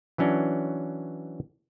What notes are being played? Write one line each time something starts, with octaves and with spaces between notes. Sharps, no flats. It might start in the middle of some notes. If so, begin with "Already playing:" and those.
E3 F#3 C#4 D4